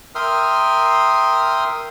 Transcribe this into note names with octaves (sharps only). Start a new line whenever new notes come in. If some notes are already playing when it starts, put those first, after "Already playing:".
A#4 E5 G5 C6 D#6 F6